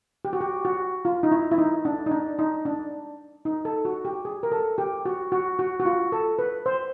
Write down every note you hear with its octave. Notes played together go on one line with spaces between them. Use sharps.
G4
F#4
G4
F#4
F4
D#4
E4
E4
D#4
D4
D#4
D4
D#4
D4
D#4
A4
F#4
G4
G#4
A#4
A4
G4
F#4
F#4
F#4
F#4
F4
A4
B4
C5